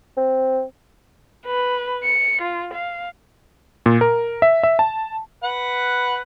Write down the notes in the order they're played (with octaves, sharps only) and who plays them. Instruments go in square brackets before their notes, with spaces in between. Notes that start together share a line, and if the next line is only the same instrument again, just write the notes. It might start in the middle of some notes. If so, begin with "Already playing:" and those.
[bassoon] C4
[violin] B4
C#7
F4
F5
[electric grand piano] A#2
A#4
E5
E5
A5
[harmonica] B4 F#5